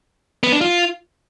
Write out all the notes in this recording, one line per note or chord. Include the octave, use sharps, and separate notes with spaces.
B3
D4
F4